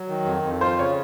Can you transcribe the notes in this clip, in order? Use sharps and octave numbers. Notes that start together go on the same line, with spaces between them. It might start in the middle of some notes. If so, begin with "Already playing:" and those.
Already playing: F#3
D#3
F2
F2
F4 C5
C#3 C#5